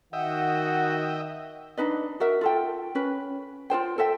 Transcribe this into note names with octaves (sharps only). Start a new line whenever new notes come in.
D#3 F#4 D#5 E5 F#5 G5
D4 D#4 B4 D#5
F#4 A#4 E5
F4 A4 G5
C#4 B4
F4 A4 C5 G5
A4 C5 E5 G5